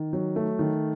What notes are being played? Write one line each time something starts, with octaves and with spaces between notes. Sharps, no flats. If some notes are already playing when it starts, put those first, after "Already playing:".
Already playing: D#3
F#3
A3
D#3